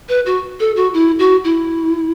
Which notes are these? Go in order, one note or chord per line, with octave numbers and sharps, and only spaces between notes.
B4
F#4
A4
F#4
E4
F#4
E4